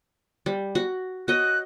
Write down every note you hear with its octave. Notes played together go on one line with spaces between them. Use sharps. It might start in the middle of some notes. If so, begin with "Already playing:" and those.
G3
F#4
F#4 C#5 D#5 F#6